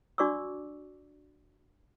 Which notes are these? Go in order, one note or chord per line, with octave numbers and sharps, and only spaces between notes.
D4 F#4 D5 C#6 D6 E6